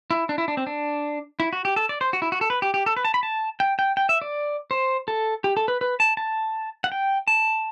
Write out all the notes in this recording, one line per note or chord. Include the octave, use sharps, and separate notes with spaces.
E4
D4
E4
D4
C4
D4
E4
F#4
G4
A4
D5
C5
F#4
E4
F#4
A4
B4
G4
G4
A4
B4
A5
B5
A5
G5
G5
G5
E5
D5
C5
A4
G4
A4
B4
B4
A5
A5
F#5
G5
A5